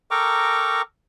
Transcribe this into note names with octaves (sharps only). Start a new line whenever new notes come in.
A4 A#4 G5 A#5 C#6 D6